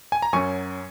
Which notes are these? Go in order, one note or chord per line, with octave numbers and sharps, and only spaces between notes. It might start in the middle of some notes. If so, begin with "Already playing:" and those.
G#5
A#5
F#2 F#3 C#4 G#5 C#6